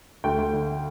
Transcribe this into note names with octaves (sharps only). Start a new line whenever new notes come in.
D2 G5
D2
D3